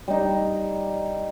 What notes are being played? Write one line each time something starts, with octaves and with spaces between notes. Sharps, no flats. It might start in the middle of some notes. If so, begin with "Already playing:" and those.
G3 D#4